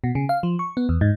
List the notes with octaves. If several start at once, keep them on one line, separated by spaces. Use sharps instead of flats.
B2
C#3
F5
F3
C#6
B3
E2
G#2